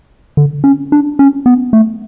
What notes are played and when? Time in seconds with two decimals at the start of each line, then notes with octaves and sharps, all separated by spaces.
0.37 D3
0.64 C#4
0.92 D4
1.19 C#4
1.46 B3
1.73 A3